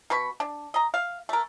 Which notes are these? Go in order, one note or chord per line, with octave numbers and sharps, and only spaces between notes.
B2 B4 B5 C#6
D4
D#5 A#5
F5
A3 A#4